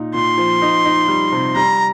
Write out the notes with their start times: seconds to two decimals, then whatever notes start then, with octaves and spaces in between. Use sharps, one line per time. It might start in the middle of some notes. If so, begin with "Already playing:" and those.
Already playing: A#2 D#4
0.14 A#2 C6
0.38 F3
0.62 D#4
0.85 D#4
1.08 G3
1.32 C3
1.56 G3 A#5